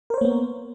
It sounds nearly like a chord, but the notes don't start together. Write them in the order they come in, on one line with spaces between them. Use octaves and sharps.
A#4 C5 C#5 A#3 B3